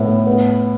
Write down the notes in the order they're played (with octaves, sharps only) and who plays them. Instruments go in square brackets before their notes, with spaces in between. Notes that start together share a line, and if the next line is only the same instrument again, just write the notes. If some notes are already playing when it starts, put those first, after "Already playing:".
Already playing: [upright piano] A2 B3
B3